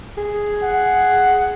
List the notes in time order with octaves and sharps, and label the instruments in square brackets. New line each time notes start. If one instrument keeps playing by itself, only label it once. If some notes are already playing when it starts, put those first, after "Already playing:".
[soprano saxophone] G#4
[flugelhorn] F#5